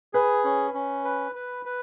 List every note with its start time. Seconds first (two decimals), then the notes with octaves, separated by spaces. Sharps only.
0.13 G#4 B4
0.44 C#4
0.74 C#4
1.04 B4
1.35 B4
1.66 B4